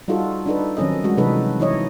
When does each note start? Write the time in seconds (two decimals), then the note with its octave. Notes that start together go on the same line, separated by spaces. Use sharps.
0.08 G3 D#4 F4 F#4 A4
0.46 D4 D#4 A4 B4
0.77 D#3 F#3 C4 C#4 A4 D#5
1.04 G3 G#3 F#4
1.17 C3 E3 F#3 D#4 A4 B4
1.60 E3 D#4 E4 C#5 D#5